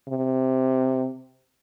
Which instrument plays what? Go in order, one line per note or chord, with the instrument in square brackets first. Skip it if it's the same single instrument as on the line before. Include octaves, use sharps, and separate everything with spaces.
[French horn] C3